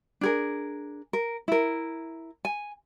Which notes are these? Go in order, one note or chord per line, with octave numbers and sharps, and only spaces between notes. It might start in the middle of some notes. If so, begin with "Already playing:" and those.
D4 G#4 A#4
A#4
E4 A#4
G#5